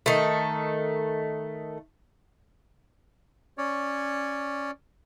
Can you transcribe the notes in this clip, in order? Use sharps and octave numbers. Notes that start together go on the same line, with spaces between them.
D#3 A3
C#4 C#5 D5